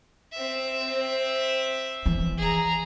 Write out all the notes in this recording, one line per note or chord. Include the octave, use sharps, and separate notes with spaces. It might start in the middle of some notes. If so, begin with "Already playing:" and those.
C4 E5
E3
G#4 A#5